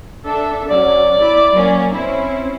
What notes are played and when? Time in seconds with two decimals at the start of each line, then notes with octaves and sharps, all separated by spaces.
0.25 D4 A4 E5
0.68 F#3 C#4 D5
1.21 E4 B5 D6
1.52 F#3 A#3 C#4
1.94 C4 C#4 E4